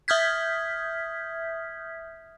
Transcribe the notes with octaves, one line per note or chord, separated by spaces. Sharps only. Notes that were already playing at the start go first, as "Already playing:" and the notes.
E5 D#6 F6 G6 G#6 B6